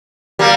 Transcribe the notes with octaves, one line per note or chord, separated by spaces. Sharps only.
G3 A#3